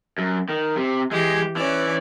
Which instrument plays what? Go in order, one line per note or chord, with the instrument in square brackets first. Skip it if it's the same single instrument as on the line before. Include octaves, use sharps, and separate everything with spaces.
[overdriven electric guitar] F#2
D#3
C3
[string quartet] E3 G4 [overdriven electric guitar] G#3
[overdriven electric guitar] E3 [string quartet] C#4 D5